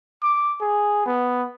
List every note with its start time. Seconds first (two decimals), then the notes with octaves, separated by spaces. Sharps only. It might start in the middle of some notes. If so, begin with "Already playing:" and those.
0.23 D6
0.61 G#4
1.06 B3